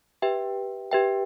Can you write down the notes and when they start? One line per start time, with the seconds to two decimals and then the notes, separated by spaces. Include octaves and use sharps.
0.22 G4 B4 E5 G5
0.91 G4 B4 E5 G5